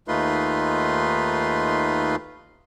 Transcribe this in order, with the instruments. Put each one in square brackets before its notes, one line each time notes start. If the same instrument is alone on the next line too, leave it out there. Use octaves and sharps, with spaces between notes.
[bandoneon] D#2 A3 D#4 F4 B4 C6